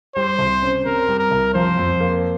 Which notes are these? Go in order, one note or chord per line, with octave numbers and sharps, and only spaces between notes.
G3 C5
C2
C#4
C3 A#4
G3
A#4
C2
F3 C5
F2
A#3